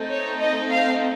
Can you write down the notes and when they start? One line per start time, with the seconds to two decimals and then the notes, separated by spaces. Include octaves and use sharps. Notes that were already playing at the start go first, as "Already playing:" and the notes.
Already playing: A3 C4 D#4 A4
0.09 C#5
0.40 D#5
0.69 F5